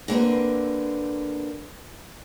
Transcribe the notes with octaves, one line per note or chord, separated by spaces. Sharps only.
D3 A#3 C4 B4